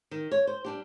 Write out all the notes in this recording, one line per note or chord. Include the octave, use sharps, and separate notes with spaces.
D#3
C#5
C5
G3 D4 G4